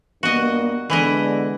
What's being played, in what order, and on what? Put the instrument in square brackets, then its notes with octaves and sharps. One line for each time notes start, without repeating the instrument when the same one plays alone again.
[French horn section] G2 A#3 B3 [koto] F#4 D#5
[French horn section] D3 G#3 B3 [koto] E3 E4 D#5